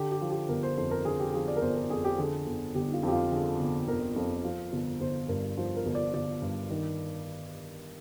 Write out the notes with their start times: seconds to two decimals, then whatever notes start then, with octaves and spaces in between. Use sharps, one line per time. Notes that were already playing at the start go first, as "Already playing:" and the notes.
Already playing: D3 G4
0.12 G4
0.21 F3
0.30 G4
0.49 G1 A#4
0.63 C5
0.77 F2 C5
0.91 A#4
1.05 D3 G#4
1.20 G4
1.34 F3 G#4
1.48 D5
1.57 A#4
1.62 G1 C5
1.76 A#4
1.90 F2 G#4
2.05 G4
2.18 D3 G#4
2.47 G1
2.75 G1 G4
2.88 D#4
2.94 F4
3.03 F2 G4
3.12 F4
3.31 D3 G#4
3.60 G1
3.88 G1 A#4
4.16 F2
4.44 F3
4.73 G1
5.00 G1 C5
5.29 G2 A#4
5.57 F3 C5
5.76 A#4
5.86 G1
5.95 D5
6.14 G1 D5
6.42 G2
6.70 D#3